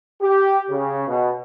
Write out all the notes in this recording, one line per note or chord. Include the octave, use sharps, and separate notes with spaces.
G4
C#3
B2